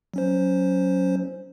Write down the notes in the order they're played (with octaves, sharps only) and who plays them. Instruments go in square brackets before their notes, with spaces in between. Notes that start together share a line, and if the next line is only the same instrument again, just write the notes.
[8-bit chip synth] F#3 C#4 C5